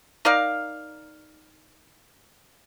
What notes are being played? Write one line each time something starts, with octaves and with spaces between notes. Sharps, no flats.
D#4 A#4 D5 F5